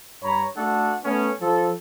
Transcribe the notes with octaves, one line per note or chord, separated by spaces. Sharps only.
G2 C#5 A#5 B5
A3 D4 F#4 A4 F#5
A3 B3 C#4
F3 A4